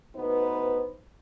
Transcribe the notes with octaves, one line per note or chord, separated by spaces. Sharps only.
D2 B3 D#4 B4 C5